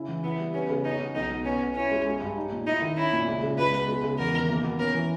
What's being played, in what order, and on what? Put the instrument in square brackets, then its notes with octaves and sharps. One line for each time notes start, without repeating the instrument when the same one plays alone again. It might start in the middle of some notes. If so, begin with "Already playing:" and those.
Already playing: [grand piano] C#3 E4
E3
[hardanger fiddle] B3 [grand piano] E4
[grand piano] G3
[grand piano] B3 [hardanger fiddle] C#4
[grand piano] C#3
[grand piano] C#4 [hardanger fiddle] D#4
[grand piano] B2
[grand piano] B1 [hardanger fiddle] D#4
[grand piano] B2
[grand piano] B3 [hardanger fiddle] C#4
[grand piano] B2
[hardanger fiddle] C#4 [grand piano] E4
[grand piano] G#3
G#3
G2
D#4
A#2
[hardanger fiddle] D#4 [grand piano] E4
[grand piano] D#3
[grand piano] C#4 [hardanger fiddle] E4
[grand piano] A#2
C#2
C#3
[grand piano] C#2 [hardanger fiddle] B4
[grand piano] B2
G#3
C#3
[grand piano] E2 [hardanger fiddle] A#4
[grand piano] D#3
A#3
B2
[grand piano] C#4 [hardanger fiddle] A#4
[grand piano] E3